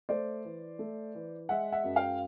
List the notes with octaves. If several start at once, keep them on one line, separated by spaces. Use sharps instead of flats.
A3 C5 D5
E3
A3
E3
G#3 E5 F#5
E5 F#5
F#2
F5 G5